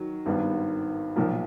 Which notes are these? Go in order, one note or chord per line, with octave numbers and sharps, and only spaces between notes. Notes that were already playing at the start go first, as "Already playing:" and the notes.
Already playing: D#3 F#3
G#1 G2 D#3 G3 B3
B1 A#2 F3 A#3